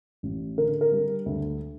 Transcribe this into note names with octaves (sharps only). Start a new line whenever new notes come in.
A1
D3 A#4
A#4
G3
D2